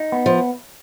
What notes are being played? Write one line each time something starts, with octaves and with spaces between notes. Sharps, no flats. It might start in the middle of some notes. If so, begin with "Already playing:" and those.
Already playing: D#4
B3
F3